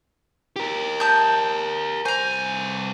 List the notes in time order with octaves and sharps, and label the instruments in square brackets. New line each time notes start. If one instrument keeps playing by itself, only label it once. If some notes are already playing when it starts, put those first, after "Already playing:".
[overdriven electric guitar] G4 A#4
[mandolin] A5 D#6 G6
[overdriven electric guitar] C2 G#5 [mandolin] C5 A#5